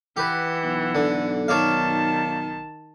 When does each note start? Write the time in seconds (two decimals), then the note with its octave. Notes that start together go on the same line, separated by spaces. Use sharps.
0.17 E3 G4 B4 F#5
0.63 B1
0.95 D3
1.48 D#3 C#5 D5 F5 A5